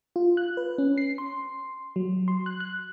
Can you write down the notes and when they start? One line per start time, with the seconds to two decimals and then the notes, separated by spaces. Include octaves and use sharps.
0.16 F4
0.37 F#6
0.57 B4
0.78 C#4
0.98 C7
1.18 C6
1.96 F#3
2.28 C6
2.46 F#6
2.60 F#6